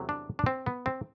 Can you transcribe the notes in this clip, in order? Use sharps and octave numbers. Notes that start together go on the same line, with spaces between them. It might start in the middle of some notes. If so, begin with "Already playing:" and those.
Already playing: E2 C3 F#3 A3
D4
D4
C4
B3
C4